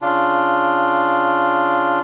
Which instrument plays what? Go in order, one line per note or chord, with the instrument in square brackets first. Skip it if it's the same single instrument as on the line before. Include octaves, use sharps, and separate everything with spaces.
[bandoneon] C#3 D4 F4